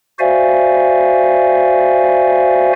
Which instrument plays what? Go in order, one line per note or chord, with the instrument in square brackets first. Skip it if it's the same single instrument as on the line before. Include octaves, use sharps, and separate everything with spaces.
[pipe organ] F#4 C5 D5 E5 F5 G#5